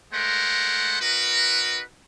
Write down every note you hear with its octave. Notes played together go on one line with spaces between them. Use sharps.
G#3 A3 A#4 C5 F#5
D#4 F#4 A#4 B4